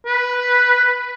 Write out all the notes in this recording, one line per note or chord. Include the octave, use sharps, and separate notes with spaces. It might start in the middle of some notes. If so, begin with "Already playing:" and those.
B4